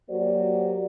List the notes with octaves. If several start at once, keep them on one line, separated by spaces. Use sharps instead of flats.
F#3 A#3 F#4 G4 C5 D5